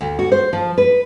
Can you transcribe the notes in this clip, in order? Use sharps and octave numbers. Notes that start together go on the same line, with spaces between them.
D2
F#4
C5
F3
B4